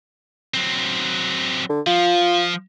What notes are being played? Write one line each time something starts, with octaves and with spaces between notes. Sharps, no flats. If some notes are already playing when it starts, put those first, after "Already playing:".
F#3 C4
D3
F3 F4